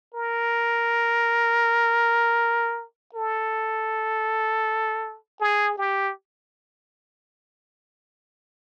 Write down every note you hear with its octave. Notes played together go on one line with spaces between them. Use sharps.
A#4
A4
G#4
G4